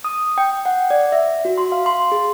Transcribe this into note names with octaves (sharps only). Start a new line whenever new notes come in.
D#6
G5
F#5
D5
E5
F#4
C6
F5
C6
G#4